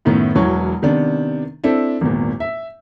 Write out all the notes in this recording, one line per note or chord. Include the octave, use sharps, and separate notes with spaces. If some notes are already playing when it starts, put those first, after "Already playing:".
F#2 A2 D#3 B3 E4
E1 E3 F#3 C#6
C3 D#3 B3 D4
C4 D4 E4 A4
G#1 E2 A#2
E5